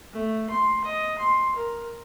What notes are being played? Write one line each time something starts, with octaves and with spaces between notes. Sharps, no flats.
A3
C6
D#5
C6
A#4